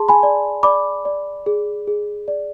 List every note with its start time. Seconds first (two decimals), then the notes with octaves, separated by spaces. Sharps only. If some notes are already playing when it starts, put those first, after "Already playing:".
Already playing: G#4 A5 C6
0.09 G#5 B5
0.23 D5
0.63 D5 B5 D6
1.05 D5
1.46 G#4
1.87 G#4
2.28 D5